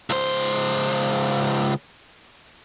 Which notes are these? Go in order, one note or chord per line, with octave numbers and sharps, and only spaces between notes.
C#2 C5